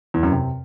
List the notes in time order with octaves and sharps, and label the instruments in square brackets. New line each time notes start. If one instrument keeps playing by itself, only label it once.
[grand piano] E2
F#2
C3